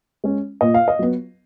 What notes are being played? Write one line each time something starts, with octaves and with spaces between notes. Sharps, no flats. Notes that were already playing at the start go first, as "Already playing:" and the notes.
G#3 C#4
A#2 D#5
F5
D#5
F#3 B3